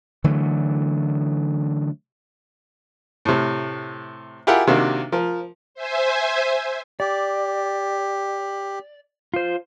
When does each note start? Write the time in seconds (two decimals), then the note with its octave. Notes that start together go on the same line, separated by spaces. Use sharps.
0.24 D3 E3 F#3 A3
3.25 A2 C3
4.47 E4 F4 G4 G#4 A#4 F#5
4.67 C3 D#3 A#3 D4 F#4
5.12 F3 A#4
5.75 C5 E5 G#5
7.00 G4 D5
9.34 F4 C5